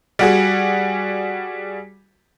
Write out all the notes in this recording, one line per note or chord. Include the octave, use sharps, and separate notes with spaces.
G3 F#4 G#4